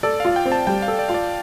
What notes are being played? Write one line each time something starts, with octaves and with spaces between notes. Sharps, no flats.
A4 D5
F4 F5
G5
C4
A5
G3 G5
F5
A4
D5
F4 F5
D5